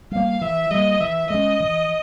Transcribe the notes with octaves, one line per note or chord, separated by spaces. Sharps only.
G3 A#3 F5
E3 E5
G3 A#3 D#5
E3 E5
G#3 C#4 D#5
E3